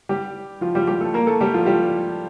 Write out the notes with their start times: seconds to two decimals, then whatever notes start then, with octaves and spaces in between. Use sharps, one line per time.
0.09 G3 G4
0.61 F3 F4
0.75 G3 G4
0.87 G3 G4
1.01 A3 A4
1.14 A#3 A#4
1.27 A3 A4
1.41 G3 G4
1.54 F3 F4
1.66 G3 G4